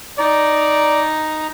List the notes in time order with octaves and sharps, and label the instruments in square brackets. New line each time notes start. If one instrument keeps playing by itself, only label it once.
[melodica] D#4 A#5 [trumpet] D5